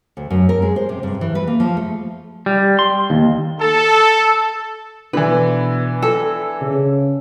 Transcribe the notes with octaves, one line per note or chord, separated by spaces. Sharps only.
D2
F#2
A#4
G#3
C5
C3
G2
E3
B4
A#3
F3
A3
G3
C6
D#2
A4
B2 D3 E3 B4
A4
C#3